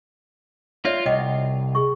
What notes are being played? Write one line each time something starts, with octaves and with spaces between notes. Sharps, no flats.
F4 C#5 D5 E5
C2 D#5 F#5 G5
G#4 C#6